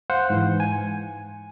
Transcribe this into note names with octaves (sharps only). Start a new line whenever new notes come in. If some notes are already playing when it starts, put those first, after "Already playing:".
C5 F5 F#5
G#2 E3
G#5